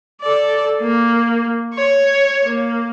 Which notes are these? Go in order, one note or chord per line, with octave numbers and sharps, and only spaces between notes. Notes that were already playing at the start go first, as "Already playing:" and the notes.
A4 D5
A#3
C#5
A#3